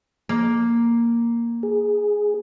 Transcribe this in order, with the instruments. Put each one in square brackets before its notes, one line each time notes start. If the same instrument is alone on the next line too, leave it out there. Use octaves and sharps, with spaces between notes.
[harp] A#3
[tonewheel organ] G#4